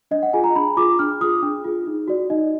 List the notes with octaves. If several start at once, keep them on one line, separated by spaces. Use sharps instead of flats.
D4 D#5
F#5
F4 G#4 G#5
A#5
D4 B5
F4 G#4 D6
D4 F6
F4 G#4 D#6
D4
F4 G#4
D#4
F#4 D5
D#4 D#5